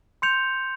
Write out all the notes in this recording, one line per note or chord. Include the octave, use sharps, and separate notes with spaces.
C6 G6 C#7 F7